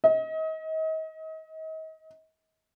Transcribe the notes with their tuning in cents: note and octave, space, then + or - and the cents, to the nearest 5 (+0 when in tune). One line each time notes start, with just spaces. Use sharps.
D#5 +35